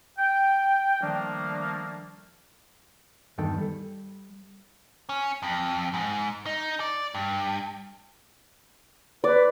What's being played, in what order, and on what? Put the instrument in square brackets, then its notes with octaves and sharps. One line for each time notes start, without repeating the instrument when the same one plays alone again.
[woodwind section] G5
D#3 F3 G3 A3 A#3 D4
[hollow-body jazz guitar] E2 G2 D#3 A4 G5
G3 A4
[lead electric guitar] C#4
F2
G#2
D#4
D5
G2
[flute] B4 [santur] D5